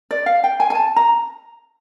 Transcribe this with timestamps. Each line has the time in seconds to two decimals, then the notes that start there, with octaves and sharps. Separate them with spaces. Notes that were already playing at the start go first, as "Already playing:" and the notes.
0.11 D5
0.26 F5
0.44 G5
0.60 G#5
0.70 G#5
0.75 A5
0.96 A#5